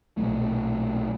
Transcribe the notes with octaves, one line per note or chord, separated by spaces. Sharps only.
B1 A#2 F#3 A3